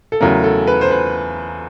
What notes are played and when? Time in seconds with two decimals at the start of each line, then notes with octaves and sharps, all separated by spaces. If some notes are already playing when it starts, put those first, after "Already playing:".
0.12 A4
0.20 E2 C#3 F#3 A3 A#4
0.44 A4
0.67 B4
0.81 C5
0.91 B4